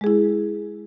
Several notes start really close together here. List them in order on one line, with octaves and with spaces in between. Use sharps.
G#3 G#4 E4